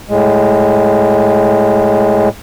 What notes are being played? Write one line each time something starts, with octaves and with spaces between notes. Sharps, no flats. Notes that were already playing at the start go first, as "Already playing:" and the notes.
A2 G#3